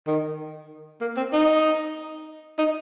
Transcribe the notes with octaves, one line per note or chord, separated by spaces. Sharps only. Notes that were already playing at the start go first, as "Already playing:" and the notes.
D#3
A#3
C4
D#4
D#4